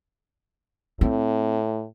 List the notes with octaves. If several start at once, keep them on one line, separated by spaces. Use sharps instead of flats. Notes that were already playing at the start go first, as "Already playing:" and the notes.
A2 C4